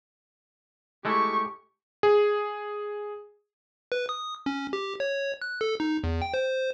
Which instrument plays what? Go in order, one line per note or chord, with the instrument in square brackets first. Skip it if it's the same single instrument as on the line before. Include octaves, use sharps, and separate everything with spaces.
[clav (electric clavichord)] G#3 A3 E4 [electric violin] G4 C#6
[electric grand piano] G#4
[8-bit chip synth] B4
D#6
C#4
G4
C#5
F#6
A4
D#4
E2
G5
C5